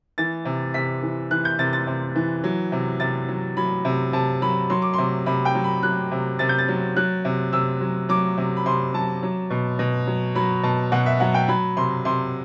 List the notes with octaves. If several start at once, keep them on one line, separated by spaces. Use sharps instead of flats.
E3 A6
C3
C3 B6
E3
E3 F#6
G6
C3 A6
A6
C3
E3
F#3
C3
C3 A6
F#3
F#3 B5
C3
C3 A5
F#3 B5
F#3 C6
D6
C3 C6
C3 B5
G5
F#3
B5
F#3 F#6
C3
C3 A6
G6
A6
F#3
F#3 F#6
C3
C3 E6
F#3
F#3 D6
C3
B5
C3 C6
F#3 A5
F#3
B2
B2
F#3
F#3 B5
B2 A5
B2 F#5
E5
F#3 F#5
G5
F#3 B5
C3 C6
C3 C6